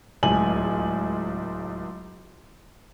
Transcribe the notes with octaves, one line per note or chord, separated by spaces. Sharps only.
D1 C#2 G#5 F#7